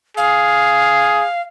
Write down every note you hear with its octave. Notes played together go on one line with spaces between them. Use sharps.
G#4 F5